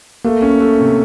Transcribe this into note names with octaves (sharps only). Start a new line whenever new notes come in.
A3 A#3
C#4
A3
C3